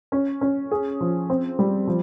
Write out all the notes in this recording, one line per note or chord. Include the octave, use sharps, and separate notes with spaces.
C#4
C#4
G#4
F3
C4
G3
F3